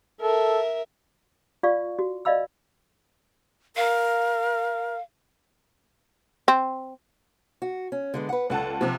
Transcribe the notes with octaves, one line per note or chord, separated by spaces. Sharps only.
A4 A#4 E5
F4 D5 F5 C#6
F#4
D5 D#5 F5 B5 E6
A#4 F5
C4
F#4
C#4
D3 G#3 B3
B4 F#5
C#2 A4 D5 F#5 A5
C3 F3 G4 A5